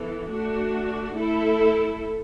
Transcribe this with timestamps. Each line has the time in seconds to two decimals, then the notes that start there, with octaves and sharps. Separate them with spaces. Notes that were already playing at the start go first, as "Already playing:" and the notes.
Already playing: E3 B3 A4
0.27 A3 D4 F#4
1.14 A3 E4 A4